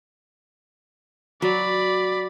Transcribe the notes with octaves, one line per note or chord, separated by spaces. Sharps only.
F#3 D5 B5